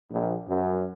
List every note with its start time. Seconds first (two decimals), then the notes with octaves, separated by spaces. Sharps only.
0.11 A#1
0.47 F#2